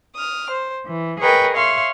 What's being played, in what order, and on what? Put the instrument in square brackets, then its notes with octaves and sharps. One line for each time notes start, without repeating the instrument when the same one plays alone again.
[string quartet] D#6 F6
C5
E3
G#4 A#4 B4 C#5 D#5 G5
C#5 E5 F5 C6